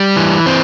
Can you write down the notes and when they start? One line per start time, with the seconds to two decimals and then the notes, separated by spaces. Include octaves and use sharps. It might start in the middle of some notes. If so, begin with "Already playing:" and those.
Already playing: G3
0.16 E3
0.46 C4